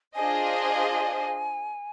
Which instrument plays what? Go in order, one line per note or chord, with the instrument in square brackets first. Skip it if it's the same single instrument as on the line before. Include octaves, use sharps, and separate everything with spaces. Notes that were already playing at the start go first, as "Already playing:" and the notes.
[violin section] D4 F4 G#4 C5 D#5 [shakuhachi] G#5